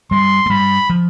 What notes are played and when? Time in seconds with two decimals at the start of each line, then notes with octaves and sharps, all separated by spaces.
0.11 G2 G3 C6
0.46 A3
0.50 G2 G3 B5
0.90 F3